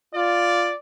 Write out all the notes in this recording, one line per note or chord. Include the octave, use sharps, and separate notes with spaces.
F4 D5